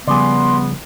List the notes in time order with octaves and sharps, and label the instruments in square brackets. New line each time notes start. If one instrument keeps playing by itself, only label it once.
[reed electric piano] C#3 F3 G3 [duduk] B3 [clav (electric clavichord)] G#4 D5 [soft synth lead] C6